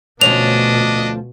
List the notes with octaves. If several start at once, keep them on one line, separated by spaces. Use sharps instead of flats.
D2 B2 F3 C#4 D4 D#5 F7